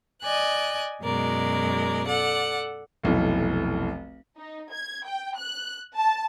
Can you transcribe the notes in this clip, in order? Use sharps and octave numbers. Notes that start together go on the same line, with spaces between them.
D5 D#5 G#5 F#6
F#2 B2 G#3 A#4 D5
A4 D5 F#5
F1 B1 E3
D#4
G#6
G5
F#6
A5